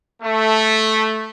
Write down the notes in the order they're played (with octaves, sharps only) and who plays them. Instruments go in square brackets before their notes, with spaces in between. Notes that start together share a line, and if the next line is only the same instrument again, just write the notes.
[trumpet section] A3